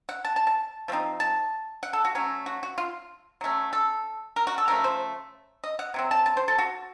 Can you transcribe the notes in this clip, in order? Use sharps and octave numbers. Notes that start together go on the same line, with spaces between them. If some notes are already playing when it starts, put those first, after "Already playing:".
F#5
A5
A5
A5
F3 A3 C4 D#4
A5
F#5
A4
F#4
F#3 A3 C#4
F#4
F#4
F4
F#3 A3 C#4
A4
A#4
F#4
A4
C#3 F3 A3 A#4
C5
D#5
F#5
C3 F#3 C4
A5
A5
C5
A4
F#4